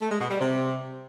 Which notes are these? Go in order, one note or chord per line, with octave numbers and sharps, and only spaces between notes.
A3
G#3
B2
G3
C3